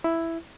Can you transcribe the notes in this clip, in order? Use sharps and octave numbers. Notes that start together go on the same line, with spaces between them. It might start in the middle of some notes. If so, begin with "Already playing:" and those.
E4